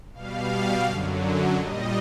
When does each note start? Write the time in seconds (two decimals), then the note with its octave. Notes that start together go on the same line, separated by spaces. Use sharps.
0.13 B2 G3 F5
0.85 F#2 D3 F#3
1.56 A#2 G3 D#5